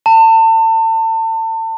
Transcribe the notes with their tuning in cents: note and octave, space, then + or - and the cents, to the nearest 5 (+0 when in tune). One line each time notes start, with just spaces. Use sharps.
A5 +35